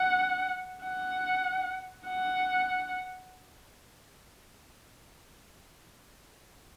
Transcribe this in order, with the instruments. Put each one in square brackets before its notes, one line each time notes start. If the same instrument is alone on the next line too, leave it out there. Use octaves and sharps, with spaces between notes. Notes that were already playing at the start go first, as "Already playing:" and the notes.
Already playing: [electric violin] F#5
F#5
F#5